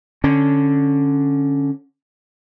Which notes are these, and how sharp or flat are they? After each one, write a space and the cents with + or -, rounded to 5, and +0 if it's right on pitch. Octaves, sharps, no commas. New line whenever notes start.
D3 +0 C#4 +0